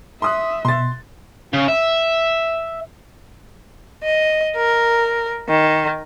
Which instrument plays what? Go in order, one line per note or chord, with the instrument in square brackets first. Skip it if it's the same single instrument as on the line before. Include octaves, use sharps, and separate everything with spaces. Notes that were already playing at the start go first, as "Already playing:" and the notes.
[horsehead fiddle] E5 [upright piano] C6 D#6 F#6
[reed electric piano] B2 [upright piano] C6 A6
[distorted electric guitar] C#3
E5
[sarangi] D#5
A#4
D#3